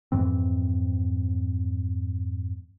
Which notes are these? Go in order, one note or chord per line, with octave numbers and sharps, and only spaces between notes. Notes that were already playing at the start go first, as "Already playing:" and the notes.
F2 G#2 E3 C4